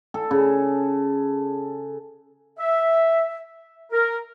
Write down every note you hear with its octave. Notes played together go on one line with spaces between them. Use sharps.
A4
C#3
E5
A#4